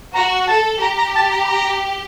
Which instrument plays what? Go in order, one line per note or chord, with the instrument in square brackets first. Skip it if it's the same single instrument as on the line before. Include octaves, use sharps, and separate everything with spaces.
[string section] F#4 [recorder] A#5
[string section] A4 [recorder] A5
[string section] G4 [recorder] A#5
[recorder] A#5
A5
A#5
B5
A#5